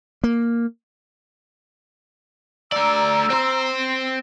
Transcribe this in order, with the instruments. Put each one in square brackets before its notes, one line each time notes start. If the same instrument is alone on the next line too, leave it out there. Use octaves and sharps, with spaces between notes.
[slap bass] A#3
[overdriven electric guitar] A3 D5 [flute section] A#5 E6
[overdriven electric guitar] C4 C5